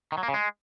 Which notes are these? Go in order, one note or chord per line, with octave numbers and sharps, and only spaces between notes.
D#3
F#3
A#3
C#3
G#3